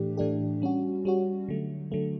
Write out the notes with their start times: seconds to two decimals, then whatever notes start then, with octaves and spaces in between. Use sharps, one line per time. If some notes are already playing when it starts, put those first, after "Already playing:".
Already playing: A2 E3 A3 D4 G4
0.17 A2 E3 A3 D4 G4
0.62 G3 C#4 F#4
1.05 G3 C#4 F#4
1.49 D3 F#3 A3
1.92 D3 F#3 A3